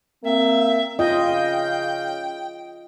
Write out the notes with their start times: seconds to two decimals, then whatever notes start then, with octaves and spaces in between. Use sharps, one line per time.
0.24 A#3 C4 E5
0.99 C#3 F4 D#5 F5 G5